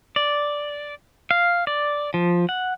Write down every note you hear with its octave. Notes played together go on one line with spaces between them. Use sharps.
D5
F5
D5
F3
F#5